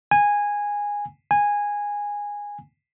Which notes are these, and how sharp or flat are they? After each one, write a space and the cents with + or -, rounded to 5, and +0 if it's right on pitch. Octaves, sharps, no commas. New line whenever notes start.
G#5 -15
G#5 -15